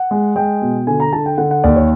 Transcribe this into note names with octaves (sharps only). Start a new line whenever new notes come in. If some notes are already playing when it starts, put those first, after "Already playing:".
Already playing: F#5
G#3
G#3 G5
B2
D3 G#5
A#5
D3 A5
G5
D3 F#5
F#5
D#2 D5
C#5